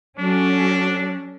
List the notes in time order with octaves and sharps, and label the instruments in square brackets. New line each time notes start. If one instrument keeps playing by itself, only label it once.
[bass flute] F#3 [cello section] C#4 A4 [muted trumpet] D4